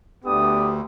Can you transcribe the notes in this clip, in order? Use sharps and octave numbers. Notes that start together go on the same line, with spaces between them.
D2 B3 D4 G4 D#6